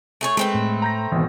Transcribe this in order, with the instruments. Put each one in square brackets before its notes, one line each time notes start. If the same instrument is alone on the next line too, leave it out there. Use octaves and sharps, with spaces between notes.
[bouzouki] A3 G#4 C#5
[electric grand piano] G#3 [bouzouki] A3 C4 B4
[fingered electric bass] A2
[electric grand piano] A#5 G6 A#6
[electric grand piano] G#1 B2 [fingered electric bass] E3